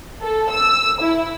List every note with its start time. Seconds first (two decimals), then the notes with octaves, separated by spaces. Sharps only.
0.21 A4
0.50 E6
1.00 E4